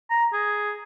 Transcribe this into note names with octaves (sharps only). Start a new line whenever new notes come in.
A#5
G#4